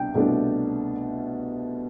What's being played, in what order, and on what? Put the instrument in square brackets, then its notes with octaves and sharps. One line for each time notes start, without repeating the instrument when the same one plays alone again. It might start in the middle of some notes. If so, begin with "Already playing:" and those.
Already playing: [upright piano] C2 B2 D4 [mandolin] G5
[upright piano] C2 B2 A3 D4